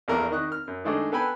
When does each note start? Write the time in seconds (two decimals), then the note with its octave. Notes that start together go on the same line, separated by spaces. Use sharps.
0.08 A#1 E2 A4 A#4 D5
0.31 D#3 D#5 C#6 F#6
0.52 F6
0.68 F#2
0.84 D#3 G#3 A3 D4
1.12 B3 A4 B4 G5 G#5 B5